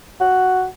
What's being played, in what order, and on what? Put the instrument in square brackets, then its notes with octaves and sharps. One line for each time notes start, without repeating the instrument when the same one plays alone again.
[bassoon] F#4